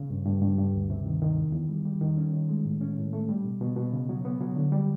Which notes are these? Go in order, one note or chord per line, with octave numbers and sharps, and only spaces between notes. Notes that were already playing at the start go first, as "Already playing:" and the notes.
Already playing: C#3
G2
G2
G2
G2
D2
C3
D#3
D#3
E2
E2
G3
G3
D#3
C#4
D#3
G#3
A2
C#4
A2
A3
G3
B2
B2
B2
C#3
F#3
B3
F#3
D3
G3